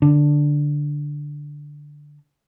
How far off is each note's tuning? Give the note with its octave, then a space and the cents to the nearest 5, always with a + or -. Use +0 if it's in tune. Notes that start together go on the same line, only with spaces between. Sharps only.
D3 +0 D4 +0